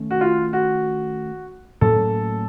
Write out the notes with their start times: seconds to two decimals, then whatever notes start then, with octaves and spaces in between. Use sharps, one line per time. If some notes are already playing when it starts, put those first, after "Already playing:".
Already playing: D#3 A3 C#4
0.11 F#4
0.21 F4
0.53 F#4
1.81 A2 F#3 A#3 C#4 A4